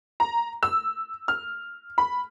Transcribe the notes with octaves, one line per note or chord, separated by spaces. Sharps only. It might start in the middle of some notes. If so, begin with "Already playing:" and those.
A#5
E6
F6
B5